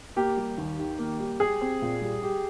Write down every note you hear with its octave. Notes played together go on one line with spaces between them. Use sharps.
A#3 G4
G3
D#2
D#3
A#3
G3
G4 G#4
C4
A#2
G3
G4